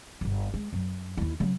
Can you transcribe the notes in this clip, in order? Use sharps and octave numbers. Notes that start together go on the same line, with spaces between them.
D1 G1
G#3
F#2 F#3
D#2 E4
C#3 F#3